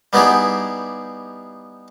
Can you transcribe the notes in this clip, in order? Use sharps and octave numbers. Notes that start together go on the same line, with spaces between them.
G3 B3 D#4 E4 G4 G#4